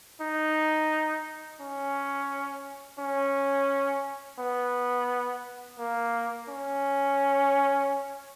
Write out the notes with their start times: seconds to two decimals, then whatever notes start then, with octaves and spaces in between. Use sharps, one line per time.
0.21 D#4
1.61 C#4
2.99 C#4
4.39 B3
5.79 A#3
6.49 C#4